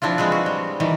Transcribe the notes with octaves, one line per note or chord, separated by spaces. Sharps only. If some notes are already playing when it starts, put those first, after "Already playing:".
F3 C4 D4 E4 F4
G#3 C4 G#4 B4
F#4
G3
D#3 E3 G3